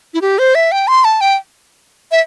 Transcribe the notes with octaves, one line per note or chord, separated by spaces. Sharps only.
E4
G4
C5
E5
G5
C6
A5
G5
E5